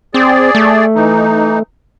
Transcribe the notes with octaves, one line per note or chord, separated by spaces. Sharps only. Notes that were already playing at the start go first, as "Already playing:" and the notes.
C4 G#4 D5
A3
E3 D#4